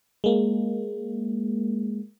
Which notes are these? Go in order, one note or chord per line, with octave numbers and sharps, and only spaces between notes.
G#3 A#3